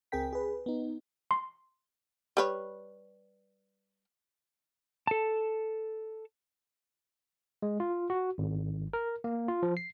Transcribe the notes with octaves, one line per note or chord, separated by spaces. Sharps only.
C#2 C4 G#4 A#4 G5 B6
G#4 B4
B3 D#4
C6
G3 B4 C#5
A4 A5
G#3
F4
F#4
G#1
A#4
A#3
F4
F3
C7